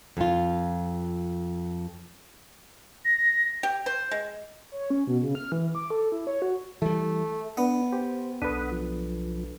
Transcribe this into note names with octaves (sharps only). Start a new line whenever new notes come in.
F2 F4
A#6
G4
C5
G#3
C#5
C#4
B2
C#3
F6
E3
D6
A4
E4
C#5
F#4
E3 G3 A3
B3 D4
G4 C5
B1 D4 A4 B4 F#5 B5 D#6
F3